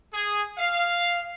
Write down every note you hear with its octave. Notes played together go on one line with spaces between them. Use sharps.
G#4
F5